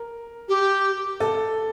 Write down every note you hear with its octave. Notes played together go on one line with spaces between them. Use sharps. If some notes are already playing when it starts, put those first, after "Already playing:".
Already playing: A#4
G4
A4